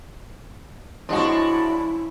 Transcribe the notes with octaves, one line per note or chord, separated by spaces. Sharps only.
F3 G#3 C#4 D4 E4 F#4